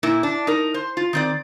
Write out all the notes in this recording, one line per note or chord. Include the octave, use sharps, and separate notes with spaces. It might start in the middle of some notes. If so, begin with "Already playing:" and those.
A#2 A#3 E4
D4
D#4 A#4
C5
F4
D#3 C4 D5